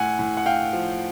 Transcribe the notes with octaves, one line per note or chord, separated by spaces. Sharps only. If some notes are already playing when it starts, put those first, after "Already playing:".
Already playing: A2 F#5 G#5
A2
F#5
A2 F5 G5
F3